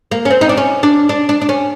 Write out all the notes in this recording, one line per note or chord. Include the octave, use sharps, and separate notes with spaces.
A#3
C#4
C4
D#4
D4
C#4
D4
D4
D4
D4
C#4